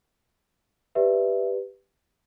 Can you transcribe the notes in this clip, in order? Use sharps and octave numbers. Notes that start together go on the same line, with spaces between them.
G4 B4 D5 E5